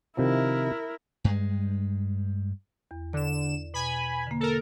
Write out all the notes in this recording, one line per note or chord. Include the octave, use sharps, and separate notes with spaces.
C3 D#3 F3 E4 A#4
G2 G#3
E2
D3 D5 E7
B2 G#5 B5
D3 A#3
A4 A#4